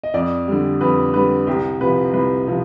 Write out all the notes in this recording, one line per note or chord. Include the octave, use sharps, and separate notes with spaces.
D#5
F2 D5
D3 G3
F2 B4
D3 G3 B4
C2 G4
C3 F3 B4
C2 B4
C3 F3